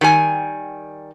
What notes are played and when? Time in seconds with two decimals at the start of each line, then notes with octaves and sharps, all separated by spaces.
0.01 D#3 G3 G4 G#5